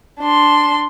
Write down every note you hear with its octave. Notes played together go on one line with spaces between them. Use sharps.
D4 C6